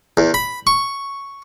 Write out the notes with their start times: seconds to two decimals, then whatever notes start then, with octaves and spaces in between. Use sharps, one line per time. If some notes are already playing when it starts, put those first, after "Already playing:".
0.17 E2
0.34 B5
0.67 C#6